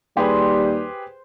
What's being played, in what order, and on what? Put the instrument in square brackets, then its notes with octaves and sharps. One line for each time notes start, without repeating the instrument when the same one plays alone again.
[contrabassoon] D#2 [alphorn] G3 [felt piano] G4 G#4 B4 [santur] C5